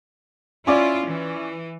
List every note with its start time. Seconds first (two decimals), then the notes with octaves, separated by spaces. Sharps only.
0.67 C#4 E4 F4 D5
1.08 E3